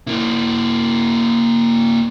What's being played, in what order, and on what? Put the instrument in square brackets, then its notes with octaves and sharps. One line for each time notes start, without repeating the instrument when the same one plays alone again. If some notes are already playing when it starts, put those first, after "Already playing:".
[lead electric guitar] A#3 E4